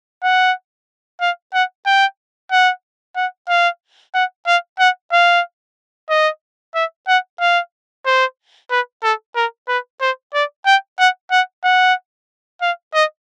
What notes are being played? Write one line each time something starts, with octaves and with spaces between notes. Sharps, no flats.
F#5
F5
F#5
G5
F#5
F#5
F5
F#5
F5
F#5
F5
D#5
E5
F#5
F5
C5
B4
A4
A#4
B4
C5
D5
G5
F#5
F#5
F#5
F5
D#5